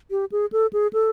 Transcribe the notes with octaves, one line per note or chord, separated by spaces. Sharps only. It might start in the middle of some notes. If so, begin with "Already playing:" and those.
G4
G#4
A4
G#4
A4